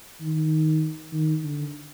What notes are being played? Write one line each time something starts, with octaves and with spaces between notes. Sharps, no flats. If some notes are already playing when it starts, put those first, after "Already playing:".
D#3
D#3
D3